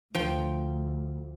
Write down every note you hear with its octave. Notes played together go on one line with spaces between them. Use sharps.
D2 F3 G5